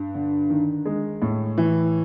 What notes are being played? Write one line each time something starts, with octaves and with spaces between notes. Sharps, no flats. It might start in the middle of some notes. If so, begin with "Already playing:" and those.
Already playing: G2
D3
D#3
G#3
A2
E3